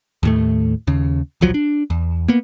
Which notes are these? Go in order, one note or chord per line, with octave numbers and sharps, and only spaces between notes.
D#2 A2 A3
D#2 C#3
D#1 B1 F3 F#3
D4
E2
A#3 B3